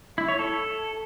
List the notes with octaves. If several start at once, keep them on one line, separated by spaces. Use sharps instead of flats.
E4
C#5
A4